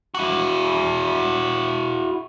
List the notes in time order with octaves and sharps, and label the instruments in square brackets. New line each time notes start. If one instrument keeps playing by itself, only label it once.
[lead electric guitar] E4 F#4